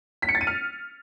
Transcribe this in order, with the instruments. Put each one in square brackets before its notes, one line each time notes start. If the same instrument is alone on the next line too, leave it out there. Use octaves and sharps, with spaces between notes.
[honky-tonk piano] B6
C#7
A6
D#7
F6